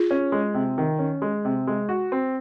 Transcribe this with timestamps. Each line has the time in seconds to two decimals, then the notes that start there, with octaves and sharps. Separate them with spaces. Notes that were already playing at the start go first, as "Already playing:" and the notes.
Already playing: F4 G#4
0.11 C#4
0.32 G#3
0.54 C3
0.78 D#3
0.99 C#4
1.22 G#3
1.45 C3
1.67 G#3
1.89 F#4
2.12 C4